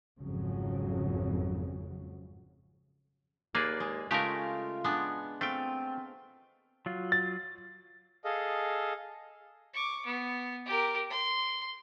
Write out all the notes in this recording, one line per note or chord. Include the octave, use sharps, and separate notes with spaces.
G#1 F2 C#3 F#3
D#2 A#3 G#4 B4 D5 E5
G#3
C#3 G#3 A3 F4 G4 A#4
G#3 B3 D4
A3 C4 F4 G5
F#3 F4
A6
G#4 A4 D#5 F5
C#6 D6
B3
G4 A#4
C6